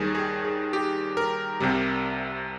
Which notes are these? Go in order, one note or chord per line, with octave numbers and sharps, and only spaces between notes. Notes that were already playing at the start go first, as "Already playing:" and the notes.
Already playing: D#2 D#3 G3 G#4
G#4
G#4
G4
A#4
C2 C3 G3